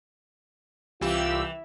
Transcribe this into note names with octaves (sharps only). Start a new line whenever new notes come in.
C2 E3 F4 G4 E6